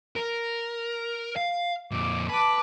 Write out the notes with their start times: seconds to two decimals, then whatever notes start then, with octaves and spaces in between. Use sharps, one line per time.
0.16 A#4
1.37 F5
1.92 F2 A#2 D6
2.29 B4 A5 D6